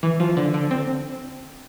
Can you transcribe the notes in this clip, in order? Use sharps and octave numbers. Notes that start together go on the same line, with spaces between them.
E3
F3
D3
D3
C4